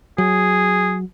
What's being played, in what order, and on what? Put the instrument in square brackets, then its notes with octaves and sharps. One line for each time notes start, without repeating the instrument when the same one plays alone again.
[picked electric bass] F#3 [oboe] G#4